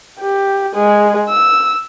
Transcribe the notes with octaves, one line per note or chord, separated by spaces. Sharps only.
G4
G#3 G#4
E6